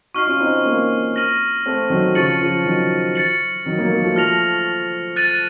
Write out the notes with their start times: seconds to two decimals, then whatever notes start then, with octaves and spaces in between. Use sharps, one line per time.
0.14 D#4 F#4 C#6 F6 C7
0.27 C#4 F4
0.40 C4 D#4
0.65 A#3 C#4
1.16 F6 A#6 D#7 F#7
1.66 A3 C4
1.90 D#3 F#3
2.15 C#3 F3 C#6 A6 C#7 F#7
2.41 C#3 F3
2.65 D#3 F#3
3.15 A6 C#7 F#7
3.66 D#3 F#3
3.78 F#3 A#3
3.91 F#3 A#3
4.03 F3 A3
4.16 F3 A3 F6 A#6 F7
5.16 F#6 A6 D#7 F#7